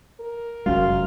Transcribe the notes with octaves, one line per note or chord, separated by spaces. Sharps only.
A#4
F1 F#2 G#3 F4